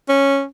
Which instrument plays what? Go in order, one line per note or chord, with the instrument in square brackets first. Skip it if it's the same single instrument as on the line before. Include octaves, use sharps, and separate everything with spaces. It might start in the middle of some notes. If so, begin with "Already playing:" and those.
[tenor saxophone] C#4